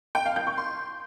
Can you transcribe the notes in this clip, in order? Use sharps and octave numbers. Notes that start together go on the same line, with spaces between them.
G5
F5
G6
C#6
C6